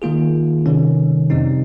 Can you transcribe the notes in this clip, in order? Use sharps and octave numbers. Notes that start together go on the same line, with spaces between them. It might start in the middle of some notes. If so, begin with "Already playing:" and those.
D#3 A#3 F4 G#4
C3 D#3 G3 C#4
F2 C3 G3 C4 D#4